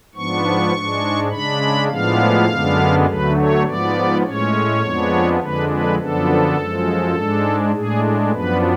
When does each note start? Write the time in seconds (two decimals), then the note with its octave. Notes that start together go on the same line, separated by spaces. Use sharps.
0.15 G#2 F3 B3 D4 C#6
0.73 G#2 G#3 D4
1.31 C#3 G#3 D4 B5
1.90 A2 F3 G#3 B3 D4 F5
2.48 F#2 D3 G#3 B3 D4
3.06 D2 D3 F#3 A3 B4
3.36 C#5
3.65 G#2 F3 B3 D5
4.23 A2 G#3 C#4 C#5
4.82 F2 F3 G#3 B3 D4
5.40 F2 D3 G#3 D4 B4
5.69 B4
5.98 F#2 D3 F3 B3 D4 A4
6.57 F#2 F3 G#3
7.15 G#2 G#3 D4
7.74 A2 G#3 D4 G#4
8.31 F#2 F3 B3 D4 B4